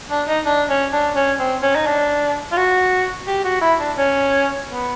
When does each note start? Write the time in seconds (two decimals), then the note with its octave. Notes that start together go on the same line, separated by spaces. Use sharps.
0.10 D4
0.28 D#4
0.46 D4
0.70 C#4
0.93 D4
1.16 C#4
1.39 C4
1.63 C#4
1.75 D#4
1.86 D4
2.52 F4
2.57 F#4
3.27 G4
3.44 F#4
3.62 E4
3.80 D4
3.97 C#4
4.68 B3